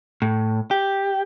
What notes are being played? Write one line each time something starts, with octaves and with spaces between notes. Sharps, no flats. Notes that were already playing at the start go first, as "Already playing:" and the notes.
A2
G4